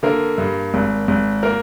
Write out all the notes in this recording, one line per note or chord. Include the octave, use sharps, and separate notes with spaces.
D3 A#3 A#4
G2
G#1
G#1
A#3 A#4